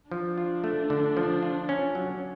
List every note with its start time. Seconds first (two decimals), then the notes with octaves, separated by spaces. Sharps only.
0.11 F3 D4
0.38 F4
0.64 A3
0.90 D3
1.17 F3
1.43 F4
1.69 C#4
1.95 F#3